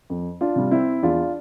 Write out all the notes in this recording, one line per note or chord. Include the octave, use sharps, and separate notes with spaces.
F2
D4 F4
C3 G3
C4 E4
E2 D4 F4